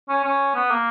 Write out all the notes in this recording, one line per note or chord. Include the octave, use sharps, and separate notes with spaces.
C#4
C#4
B3
A#3